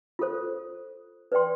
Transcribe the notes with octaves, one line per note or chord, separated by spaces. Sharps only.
F4 A4 C5
B4 D5 G5 C6